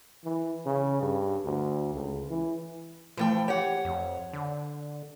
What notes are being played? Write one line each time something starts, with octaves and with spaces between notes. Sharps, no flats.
E3
C#3
G2
D2
C#2
E3
E3 F3 A3 G5
G4 C#5 F#5
F2
D3